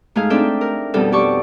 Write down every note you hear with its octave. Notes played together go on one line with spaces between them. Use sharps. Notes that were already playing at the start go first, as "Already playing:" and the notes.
G#2 A3 G#4 F5
C4 D4 D#4 A4 E5 G5
A#4
F2 B2 G3 A4
G4 A4 D5 C#6